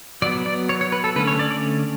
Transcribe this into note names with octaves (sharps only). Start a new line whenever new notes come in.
F#3 B3 D5
D5
C#5
C#5
B4
A4
D3 A3 C#4 B4
C#5
D5
D5